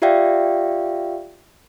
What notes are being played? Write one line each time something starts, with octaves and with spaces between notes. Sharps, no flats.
F4 G4 D5 E5 F5 G5